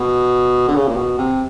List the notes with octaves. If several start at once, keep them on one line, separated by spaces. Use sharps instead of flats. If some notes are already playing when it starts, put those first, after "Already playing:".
Already playing: B2
D3
C#3
A#2
B2
C3